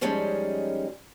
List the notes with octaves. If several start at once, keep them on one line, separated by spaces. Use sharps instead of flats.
F#2 F3 G3 G#3 C#4 D#4